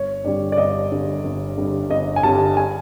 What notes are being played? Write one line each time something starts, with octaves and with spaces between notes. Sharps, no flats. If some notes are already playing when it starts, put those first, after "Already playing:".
Already playing: G1 C#5
G2 D3 G3 D5
D5
G1 D#5
G2 D3 G3
G1
G2 D3 G3
G1 D#5
G#5
G2 D3 G3 A5
G#5